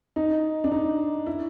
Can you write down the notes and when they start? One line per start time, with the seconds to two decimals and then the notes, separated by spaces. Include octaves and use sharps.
0.16 D#4
0.64 D4
0.72 D#4
1.26 E4